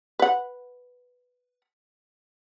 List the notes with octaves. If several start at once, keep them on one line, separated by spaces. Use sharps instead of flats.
B4 F#5